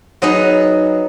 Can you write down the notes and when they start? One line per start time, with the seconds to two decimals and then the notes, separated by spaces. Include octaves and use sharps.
0.22 F#3 B3 D#4 G#4 B4